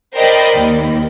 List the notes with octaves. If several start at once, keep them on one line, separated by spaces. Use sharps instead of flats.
A#4 C5 D5 D#5 G5 B5
D#2